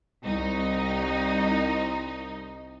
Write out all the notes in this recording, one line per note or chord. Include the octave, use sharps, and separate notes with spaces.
C2 D#4